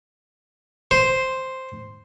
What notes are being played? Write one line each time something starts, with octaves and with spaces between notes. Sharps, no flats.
C5